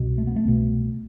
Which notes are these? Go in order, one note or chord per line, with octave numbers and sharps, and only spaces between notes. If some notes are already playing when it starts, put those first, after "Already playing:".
Already playing: C2 B2
A3
B3
A3
C2 B2